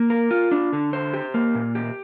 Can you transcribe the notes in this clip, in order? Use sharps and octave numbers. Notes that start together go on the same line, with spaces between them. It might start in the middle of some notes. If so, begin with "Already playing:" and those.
Already playing: A#3
A#4
F4
D4
D3
C5
G4
A#3
A#2
G4